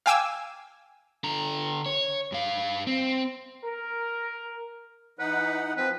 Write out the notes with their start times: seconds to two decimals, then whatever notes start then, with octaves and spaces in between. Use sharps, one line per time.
0.06 F5 G5 G#5 D6 E6
1.24 D3 A#5
1.86 C#5
2.32 G2 F5
2.87 C4
3.64 A#4
5.19 E3 D#4 B4 F#5
5.77 F3 C4 B4